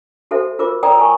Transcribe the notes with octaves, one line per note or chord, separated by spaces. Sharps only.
F#4 A4 C5 E5
F4 A#4 C5 D6
A#4 C#5 D5 G5 A#5 D#6
A#4 G#5 C#6